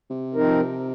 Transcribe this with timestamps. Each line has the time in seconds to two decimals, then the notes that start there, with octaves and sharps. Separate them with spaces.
0.10 C3
0.35 F3 C4 D#4 A#4